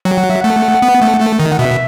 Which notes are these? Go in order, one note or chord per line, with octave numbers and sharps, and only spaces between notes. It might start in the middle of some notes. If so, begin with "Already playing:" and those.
F#3 G5
F#5
E5
A3 F#5
B3
A3
A3
D#3
F#5
B2 E5